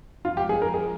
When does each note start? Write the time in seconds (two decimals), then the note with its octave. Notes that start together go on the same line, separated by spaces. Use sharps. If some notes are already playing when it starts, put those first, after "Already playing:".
0.25 G2 F3 G#3 F4
0.37 G4
0.49 G#4
0.62 A#4
0.74 G#4